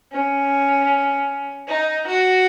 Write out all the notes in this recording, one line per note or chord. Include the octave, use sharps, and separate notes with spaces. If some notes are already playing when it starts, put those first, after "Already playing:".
C#4
D#4
F#4